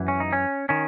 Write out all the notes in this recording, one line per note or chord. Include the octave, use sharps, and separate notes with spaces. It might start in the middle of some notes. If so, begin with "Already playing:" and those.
Already playing: F#2 E3
C#4
D#4
C#4
D#3 C#4